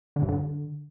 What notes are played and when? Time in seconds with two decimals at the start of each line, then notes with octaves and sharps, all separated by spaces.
0.16 D3
0.22 G2
0.28 D3